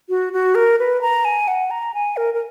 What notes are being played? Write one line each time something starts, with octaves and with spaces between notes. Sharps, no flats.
F#4
F#4
A#4
B4
A#5
G#5
F#5
A#5
G#5
A#4
A#4